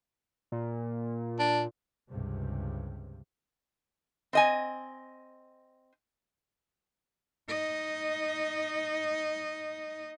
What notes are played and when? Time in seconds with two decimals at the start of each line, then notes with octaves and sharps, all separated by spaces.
0.52 A#2
1.39 D4
2.09 C#2 G2 C3
4.33 C4 D#5 G#5
7.48 D#4 D#5